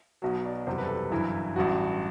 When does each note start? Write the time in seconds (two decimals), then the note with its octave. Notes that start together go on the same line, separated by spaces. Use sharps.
0.22 B1 B2 F#3
0.44 D5
0.66 F#1 E2 C3 E3 G3 C5
0.78 B4
0.83 A4
0.89 B4
1.11 G1 F#2 E3 E4
1.55 A1 G2 F#3 F#4